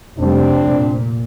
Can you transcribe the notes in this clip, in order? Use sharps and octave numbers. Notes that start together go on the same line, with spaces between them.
F1 G3 C4 D4
A#2